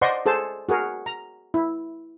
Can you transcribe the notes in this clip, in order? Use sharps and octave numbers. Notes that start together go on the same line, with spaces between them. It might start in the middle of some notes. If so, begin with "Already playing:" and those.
C5 D5 D#5 F#5 C6 C#6
G#4 A4 C5 A5
F#4 G#4 A#4
A#5
E4